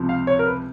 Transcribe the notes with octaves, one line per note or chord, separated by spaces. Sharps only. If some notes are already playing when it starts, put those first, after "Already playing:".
Already playing: C#2 C3 F3
F5
C#5
A#4
B4